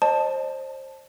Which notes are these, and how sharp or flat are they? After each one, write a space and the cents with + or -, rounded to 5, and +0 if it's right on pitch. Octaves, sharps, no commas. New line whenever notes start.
C5 +30 D#5 -45 A5 +0